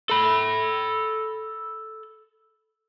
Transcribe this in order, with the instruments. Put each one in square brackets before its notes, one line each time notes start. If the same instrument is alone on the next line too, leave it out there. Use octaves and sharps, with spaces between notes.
[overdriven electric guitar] A4 B5